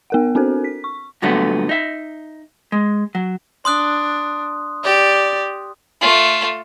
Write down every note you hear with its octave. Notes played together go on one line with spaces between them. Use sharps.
B3 A#4 F#5
C4 D4 F#4 A4 A#4 C5
B6
C#6
G2 A#2 D3 F#3 A3 B3
D#4 E5
G#3
F#3
D4 C6 D#6 F#6
G4 D5
A3 F4